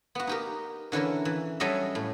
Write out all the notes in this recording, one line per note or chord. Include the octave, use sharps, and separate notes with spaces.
B3 F#4
D#4 G4 A#4
D3 E3 C#4 E4 A#4
E3
F#3 G3 C#4 A4 D#5 E5
A2